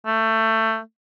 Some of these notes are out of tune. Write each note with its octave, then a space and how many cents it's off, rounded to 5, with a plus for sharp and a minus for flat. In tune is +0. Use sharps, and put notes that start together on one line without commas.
A3 +20